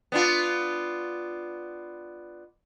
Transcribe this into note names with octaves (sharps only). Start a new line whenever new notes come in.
B3 D4 F4